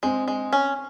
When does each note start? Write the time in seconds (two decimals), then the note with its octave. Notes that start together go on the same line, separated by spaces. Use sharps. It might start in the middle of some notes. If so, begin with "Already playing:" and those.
0.03 G#3 C4
0.28 G#3
0.53 C#4